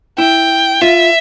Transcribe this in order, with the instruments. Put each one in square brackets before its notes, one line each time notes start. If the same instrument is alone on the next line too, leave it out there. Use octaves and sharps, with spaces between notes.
[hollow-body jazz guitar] E4 [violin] G5
[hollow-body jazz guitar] F4 [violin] E5